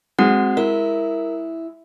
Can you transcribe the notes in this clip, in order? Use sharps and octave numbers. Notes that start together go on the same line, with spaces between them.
G#3 C4 F#4 F#5
E4 A#4